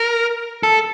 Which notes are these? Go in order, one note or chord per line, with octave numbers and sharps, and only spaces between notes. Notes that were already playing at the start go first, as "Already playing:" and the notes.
Already playing: A#4
A4